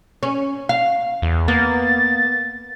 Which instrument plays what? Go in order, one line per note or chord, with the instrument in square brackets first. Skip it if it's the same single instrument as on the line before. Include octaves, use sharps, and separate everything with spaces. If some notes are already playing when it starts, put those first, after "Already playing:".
[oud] C#4
F5
[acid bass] E2
[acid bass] A#3 [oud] B3 [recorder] A6